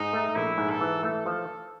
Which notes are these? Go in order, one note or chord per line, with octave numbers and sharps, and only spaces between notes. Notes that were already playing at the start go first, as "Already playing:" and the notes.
Already playing: G#2 D#4
A3
A#1 E4
G#2
A4
E3
A3 A4
F3